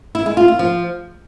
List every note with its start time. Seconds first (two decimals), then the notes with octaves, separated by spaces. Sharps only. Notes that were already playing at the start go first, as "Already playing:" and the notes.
0.15 E4
0.26 G#3
0.37 F4
0.48 F4
0.59 F3